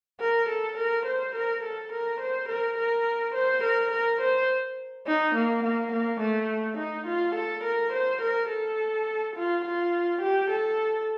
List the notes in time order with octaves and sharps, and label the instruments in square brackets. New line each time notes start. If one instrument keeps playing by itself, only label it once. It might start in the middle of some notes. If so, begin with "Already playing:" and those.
[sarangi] A#4
A4
A#4
C5
A#4
A4
A#4
C5
A#4
A#4
C5
A#4
A#4
C5
D#4
A#3
A#3
A#3
A3
D#4
F4
A4
A#4
C5
A#4
A4
F4
F4
G4
A4